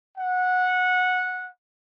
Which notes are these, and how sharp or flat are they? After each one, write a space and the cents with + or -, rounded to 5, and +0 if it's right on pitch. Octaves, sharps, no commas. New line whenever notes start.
F#5 -15